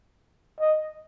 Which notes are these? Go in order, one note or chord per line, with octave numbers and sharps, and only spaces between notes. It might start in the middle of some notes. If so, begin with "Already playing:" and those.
D#5